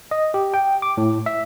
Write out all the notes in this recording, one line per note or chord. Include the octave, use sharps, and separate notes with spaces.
D#5
G4
G5
D6
A2
E5